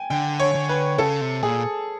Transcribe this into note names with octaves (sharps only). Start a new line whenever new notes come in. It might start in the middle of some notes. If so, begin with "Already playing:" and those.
Already playing: G5 G#5
D3 G5
C#5
D3
B4
C#3 A4
C3
A#2 G#4